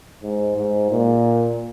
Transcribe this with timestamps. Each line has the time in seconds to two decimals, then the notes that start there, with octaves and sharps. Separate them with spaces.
0.23 G#2
0.57 G#2
0.91 A#2